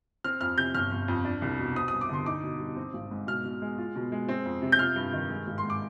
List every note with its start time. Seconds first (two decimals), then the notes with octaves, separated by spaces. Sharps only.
0.24 C4 F6
0.41 F2 F6
0.57 C3 G6
0.74 G1 F6
0.91 G1
1.08 F2
1.25 D4
1.42 C2
1.59 B2
1.76 C4 D#6
1.88 D#6
1.93 G2
2.01 D6
2.09 D3 C6
2.26 D#4 D6
2.44 B2
2.60 G3
2.76 C4
2.94 G#1
3.11 G#2
3.27 B2 F6
3.45 B2
3.62 G#3
3.78 F4
3.96 B2
4.12 G#3
4.29 C4
4.45 F2
4.62 C3
4.72 G6
4.79 F4 F6
4.96 G2
5.13 D#3
5.29 G#3
5.47 G#1
5.58 C6
5.64 G#2
5.70 D6